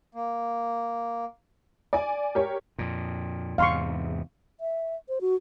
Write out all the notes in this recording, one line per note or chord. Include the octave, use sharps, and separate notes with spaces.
A#3
D5 G#5
G4 A#4 C#5
F2 A#2
E2 G#2 C3 F5 C6 C#6
E5
C5
F#4